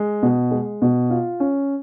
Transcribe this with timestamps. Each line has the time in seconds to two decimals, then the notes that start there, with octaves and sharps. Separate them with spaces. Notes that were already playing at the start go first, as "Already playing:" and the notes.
Already playing: G#3
0.23 B2
0.51 G#3
0.82 B2
1.10 F4
1.40 C#4